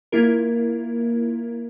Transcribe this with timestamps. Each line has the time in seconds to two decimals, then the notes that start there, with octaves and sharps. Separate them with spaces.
0.12 A#3 E4 F4 A#4